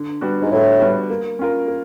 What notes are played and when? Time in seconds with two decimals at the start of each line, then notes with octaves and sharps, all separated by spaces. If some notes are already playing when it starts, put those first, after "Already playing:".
Already playing: D3
0.21 G3 B3 D4 F#4
0.42 G#2
0.51 A2 D3
0.80 G3 B3 D4 F#4
1.10 A#3
1.39 C#4 F4 A#4
1.68 A#3